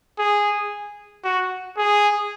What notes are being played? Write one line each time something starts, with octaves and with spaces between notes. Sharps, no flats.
G#4
F#4
G#4